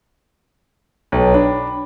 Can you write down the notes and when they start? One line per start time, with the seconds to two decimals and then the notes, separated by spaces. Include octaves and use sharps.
1.12 B1 B4 C#5 G5
1.34 D4 B5